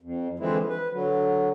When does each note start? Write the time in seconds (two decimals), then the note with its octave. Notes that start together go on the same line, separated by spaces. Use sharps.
0.01 F2
0.39 D3 E3 F3 G#3 C4 E4
0.69 B4
0.93 D3 F#3